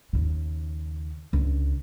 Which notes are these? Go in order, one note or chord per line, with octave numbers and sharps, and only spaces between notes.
D#2 C#3
C#2 D3